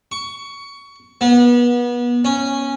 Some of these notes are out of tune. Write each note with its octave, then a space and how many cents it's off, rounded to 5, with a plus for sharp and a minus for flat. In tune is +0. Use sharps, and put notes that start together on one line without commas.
C#6 +20
B3 -30
C#4 -10